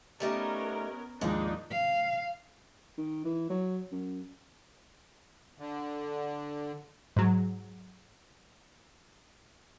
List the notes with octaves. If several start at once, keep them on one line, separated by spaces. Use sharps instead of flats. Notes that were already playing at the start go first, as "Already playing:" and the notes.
G3 A3 B3 C#4 D#4 A#4
D#2 G#2 F3 G#3 D4 D#4
F5
D#3
E3
F#3
F#2
D3
G#2 F#3